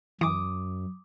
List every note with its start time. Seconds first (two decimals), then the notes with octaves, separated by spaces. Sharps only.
0.21 F#2 E3 D6 D#6